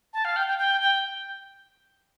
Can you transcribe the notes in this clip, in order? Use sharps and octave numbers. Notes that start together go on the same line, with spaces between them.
A5
F5
G5
G5
G5
G5